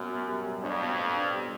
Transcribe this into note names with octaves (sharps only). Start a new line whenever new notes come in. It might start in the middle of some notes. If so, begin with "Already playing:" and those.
Already playing: F#2 B2
B2
G3
G3
F2 D4
B2
B3
D4
G3